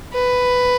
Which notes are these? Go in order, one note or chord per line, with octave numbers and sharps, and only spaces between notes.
B4